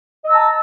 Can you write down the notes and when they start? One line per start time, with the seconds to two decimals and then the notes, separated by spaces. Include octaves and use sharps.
0.23 D#5
0.26 E6
0.30 A#5
0.33 A5